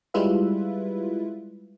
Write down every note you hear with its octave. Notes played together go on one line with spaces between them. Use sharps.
G3 G#3 E4 F4 B4 E5